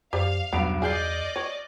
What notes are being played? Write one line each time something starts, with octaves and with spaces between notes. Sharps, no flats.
F#2 G4 C5 D5 F5
B1 E2 G2 B3 D7
G#4 D5 D#5 F6 G6 C7
C#5